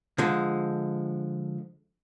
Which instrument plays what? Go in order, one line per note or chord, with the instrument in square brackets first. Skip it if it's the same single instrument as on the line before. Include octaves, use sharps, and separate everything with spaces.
[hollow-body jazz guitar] D3 F3 G#3